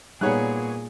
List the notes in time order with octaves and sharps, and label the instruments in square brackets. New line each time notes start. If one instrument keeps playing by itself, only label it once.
[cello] A#2 G#4 [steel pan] G3 D#4 F#5 [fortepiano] B3 C#5 F#6